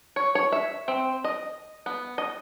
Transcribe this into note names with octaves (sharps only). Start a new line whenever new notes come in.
C#5
C#5
E5
C4
D#5
B3
D#5